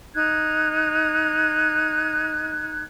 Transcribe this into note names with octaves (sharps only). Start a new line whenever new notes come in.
D#4 F#6 G#6